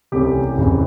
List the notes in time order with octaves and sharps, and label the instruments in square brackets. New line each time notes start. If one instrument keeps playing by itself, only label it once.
[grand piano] C2 C3 E3 A3 C#4 G4
F1 F2 C#3 E3